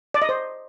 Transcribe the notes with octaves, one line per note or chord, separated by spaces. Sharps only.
D5
D#5
C5